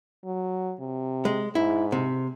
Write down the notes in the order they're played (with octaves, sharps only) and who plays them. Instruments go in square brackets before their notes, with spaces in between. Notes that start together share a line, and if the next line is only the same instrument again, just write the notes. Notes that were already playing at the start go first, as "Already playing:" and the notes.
[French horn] F#3
C3
[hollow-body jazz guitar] G#3
[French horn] G#2 [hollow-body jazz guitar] E4
[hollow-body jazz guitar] C3